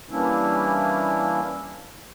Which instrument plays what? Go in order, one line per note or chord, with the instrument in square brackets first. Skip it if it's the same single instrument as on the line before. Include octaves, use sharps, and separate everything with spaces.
[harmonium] E3 G3 A#3 C#4 D4 E4